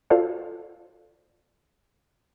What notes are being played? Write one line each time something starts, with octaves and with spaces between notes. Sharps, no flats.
F4 F#4 A4 C5 D5 F5